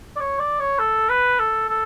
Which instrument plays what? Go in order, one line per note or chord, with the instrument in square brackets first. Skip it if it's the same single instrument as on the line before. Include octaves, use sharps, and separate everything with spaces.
[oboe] D5
C#5
D5
C#5
A4
B4
A4
A4